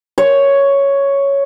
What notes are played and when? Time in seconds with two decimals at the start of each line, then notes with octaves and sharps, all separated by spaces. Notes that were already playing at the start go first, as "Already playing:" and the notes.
0.18 C#5